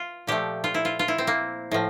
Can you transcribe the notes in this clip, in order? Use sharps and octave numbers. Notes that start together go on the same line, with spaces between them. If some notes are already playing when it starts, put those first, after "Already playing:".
Already playing: F4
A#2 F3 A3 G4
F4
E4
F4
F4
E4
C4
A#3
A2 F3